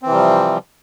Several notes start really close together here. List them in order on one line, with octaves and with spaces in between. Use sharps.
C4 E3 C3 G3 F3